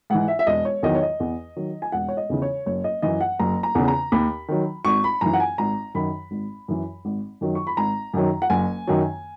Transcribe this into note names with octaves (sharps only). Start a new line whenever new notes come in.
G#2 E3 F#5
E5
E5
E1 D#5
C#5
E2 D#3 F#3 D#5
C#5
D#5
E2
D#3 F#3
G#5
E1 F#5
C#5
D#5
E2 C#3 E3
C#5
F#1 C#5
D#5
F#2 E3 D#5
F#5
F#1 A#5
A#5
E2 C#3
A#5
D#2 B5
D#3 F#3
G#1 C#6
B5
F#2 E3 A#5
F#5
G#5
G#1 A#5
F#2 D#3 B5
G#1
F#2 E3
G#1
F#2 D#3 F#3
C#6
B5
G#1 A#5
F#2 D#3 F#3
F#5
F#1 G#5
F#2 D#3 F#3